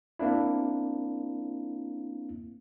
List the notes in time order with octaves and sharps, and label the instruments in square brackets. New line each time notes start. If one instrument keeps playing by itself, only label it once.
[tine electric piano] A#3 C4 D4 E4